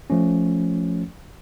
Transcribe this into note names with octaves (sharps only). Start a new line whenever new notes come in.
F3 A3 C#4